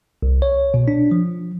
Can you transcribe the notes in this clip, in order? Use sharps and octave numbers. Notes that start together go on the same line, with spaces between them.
C2
C#5
B2
D4
F3